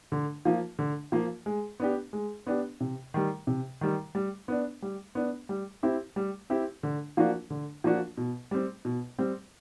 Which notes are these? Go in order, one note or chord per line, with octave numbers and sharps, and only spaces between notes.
D3
F3 A#3
D3
F3 A#3
G#3
B3 D4 G4
G#3
B3 D4 G4
C3
D#3 G3
C3
D#3 G3
G3
B3 D4
G3
B3 D4
G3
C4 E4 G4
G3
C4 E4 G4
D3
F3 A#3 D4 F#4
D3
F3 A#3 D4 F#4
B2
G3 C4
B2
G3 C4